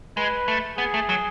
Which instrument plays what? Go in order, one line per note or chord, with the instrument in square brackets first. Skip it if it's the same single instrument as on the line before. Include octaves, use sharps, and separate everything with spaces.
[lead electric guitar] G#3 [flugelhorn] B4
[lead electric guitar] A3
[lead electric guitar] B3 [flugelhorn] G#4
[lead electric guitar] A3
F#3